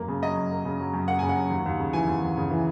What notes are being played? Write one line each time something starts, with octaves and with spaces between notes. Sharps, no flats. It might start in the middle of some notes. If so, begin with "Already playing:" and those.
Already playing: F#2 A#3
C#3
F#3 D#5
F#2
A#3
C#3
F#3
F#2
A#3 F#5
C#3 G#5
F#5
F#3
D#2
D#2
C#3
E3 G#5
D#2
D#2
C#3
E3